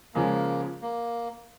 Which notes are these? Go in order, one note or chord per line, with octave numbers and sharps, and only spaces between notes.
C#3 F3 G#3 A#3
A#3